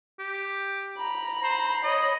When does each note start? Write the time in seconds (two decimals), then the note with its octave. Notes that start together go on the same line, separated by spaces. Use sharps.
0.19 G4
0.97 A#5 B5
1.44 C5
1.84 C#5 D#5 B5